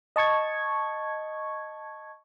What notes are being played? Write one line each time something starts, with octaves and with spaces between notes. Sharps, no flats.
D#5 A5 C#6 G#6